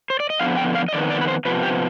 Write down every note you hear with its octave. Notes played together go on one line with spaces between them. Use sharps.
C5
D5
D#5
F2 D3 F3 B3 F5
G5
F5
D#5
F2 D#3 B3 D5
D5
B4
C5
C3 F3 B3 B4
G4